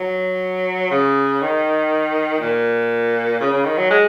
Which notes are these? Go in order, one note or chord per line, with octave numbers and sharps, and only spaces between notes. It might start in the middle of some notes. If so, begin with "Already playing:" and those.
Already playing: F#3
C#3
D#3
A#2
C#3
C#3
D#3
F#3
G#3